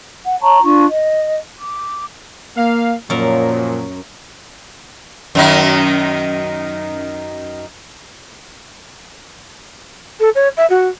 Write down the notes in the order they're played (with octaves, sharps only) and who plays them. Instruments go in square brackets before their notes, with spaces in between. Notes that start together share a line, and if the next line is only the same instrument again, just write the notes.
[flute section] F#5
C#5 A5 A#5 C#6
D4 F4 C#6
D#5
D6
[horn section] A#3 F5
[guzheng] F#2 A#4 [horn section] A#2 F3 F#3
[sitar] F#2 D#3 D#4
[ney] A4
C#5
E5
F#4